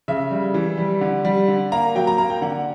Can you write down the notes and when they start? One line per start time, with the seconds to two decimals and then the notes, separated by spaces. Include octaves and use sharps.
0.08 C#3 E5
0.31 G3
0.54 E3
0.78 G3
1.01 D3
1.25 G3
1.48 D3
1.72 A#3 A#5
1.95 F#3 G5
2.07 A#5
2.18 A#3 A#5
2.30 G5
2.42 D3 F#5